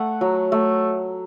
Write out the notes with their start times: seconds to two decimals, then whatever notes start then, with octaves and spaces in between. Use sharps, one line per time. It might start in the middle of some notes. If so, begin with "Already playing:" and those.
Already playing: A3 F#5
0.21 F#3
0.52 A3